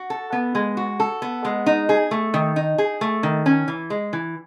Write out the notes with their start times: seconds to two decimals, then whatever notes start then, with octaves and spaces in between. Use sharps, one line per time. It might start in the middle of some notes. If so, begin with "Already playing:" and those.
Already playing: F#4
0.10 A4
0.33 B3
0.55 G#3
0.77 F#4
1.00 A4
1.22 B3
1.45 G#3
1.66 D#4
1.89 G#4
2.11 A3
2.34 D#3
2.56 D#4
2.78 G#4
3.01 A3
3.23 D#3
3.46 C#4
3.68 E3
3.90 G#3
4.13 E3